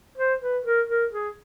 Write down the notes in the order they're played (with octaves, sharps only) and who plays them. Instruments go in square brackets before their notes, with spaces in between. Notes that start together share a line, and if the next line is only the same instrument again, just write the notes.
[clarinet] C5
B4
A#4
A#4
G#4